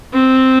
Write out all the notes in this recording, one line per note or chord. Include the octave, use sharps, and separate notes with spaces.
C4